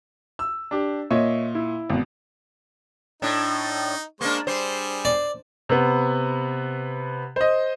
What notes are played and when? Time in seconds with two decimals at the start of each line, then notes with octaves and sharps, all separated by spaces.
0.39 E6
0.71 D4 G4
1.11 A#2 C#5 D#5 E5
1.55 E4
1.90 G#1 B2
3.22 A2 D4 D#4
4.21 G#3 A#3 D4 C5 C#6
4.47 G3 G#4 C5
5.05 D5
5.69 C3 B3
7.36 C5 D#5